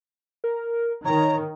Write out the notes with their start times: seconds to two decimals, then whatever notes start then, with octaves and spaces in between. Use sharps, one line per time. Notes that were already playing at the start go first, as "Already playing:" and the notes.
0.44 A#4
1.05 D#3 C#5 A#5